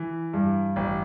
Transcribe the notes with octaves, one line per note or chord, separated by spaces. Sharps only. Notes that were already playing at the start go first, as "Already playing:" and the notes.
Already playing: E3
G2
A1